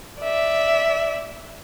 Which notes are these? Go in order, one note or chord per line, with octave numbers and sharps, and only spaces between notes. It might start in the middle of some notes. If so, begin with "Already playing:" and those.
D5 E5